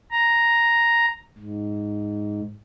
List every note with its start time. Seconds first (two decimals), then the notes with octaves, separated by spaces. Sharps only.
0.11 A#5
1.38 G#2